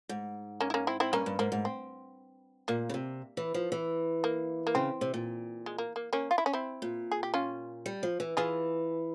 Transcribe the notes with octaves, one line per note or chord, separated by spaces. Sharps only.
G#2
A#3 C#4
E4
A#3 C#4
C4 E4
C4 E4
G2 A#3 C#4
G2
G#2 A#3
G#2
C4
A#2 A#3
C#3
C3
E3
F3
E3
A#3
A#3
C#3 C4
C3
A#2
G#3
A#3
A#3
A#3 C#4
F4
E4
C#4
C4 E4
A#2
G#4
G4
C#4 F4
G3
F3
E3
E3 F4 G#4